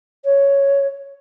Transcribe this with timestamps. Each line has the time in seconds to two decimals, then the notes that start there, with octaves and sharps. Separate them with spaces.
0.24 C#5